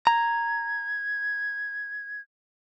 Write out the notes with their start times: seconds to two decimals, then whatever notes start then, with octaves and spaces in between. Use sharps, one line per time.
0.07 A#5 G#6